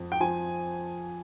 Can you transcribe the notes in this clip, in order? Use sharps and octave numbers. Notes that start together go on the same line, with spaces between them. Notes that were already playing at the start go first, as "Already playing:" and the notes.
Already playing: F2
G5
F3 G#5